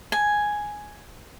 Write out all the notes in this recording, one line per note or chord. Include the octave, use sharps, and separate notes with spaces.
G#5